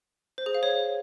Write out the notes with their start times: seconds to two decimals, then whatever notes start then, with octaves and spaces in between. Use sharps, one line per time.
0.38 C5
0.46 G#4
0.54 F5
0.63 C#5